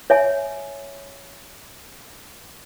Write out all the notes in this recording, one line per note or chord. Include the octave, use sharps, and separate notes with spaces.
C#5 E5 G#5